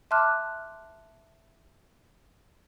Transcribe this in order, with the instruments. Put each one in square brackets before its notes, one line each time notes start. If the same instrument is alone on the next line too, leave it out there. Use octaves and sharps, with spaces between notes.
[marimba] E5 A5 C6 D6 F6 F#6